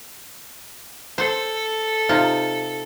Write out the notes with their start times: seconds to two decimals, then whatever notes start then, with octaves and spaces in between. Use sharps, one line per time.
1.18 A4 C5
2.09 C3 D#4 F4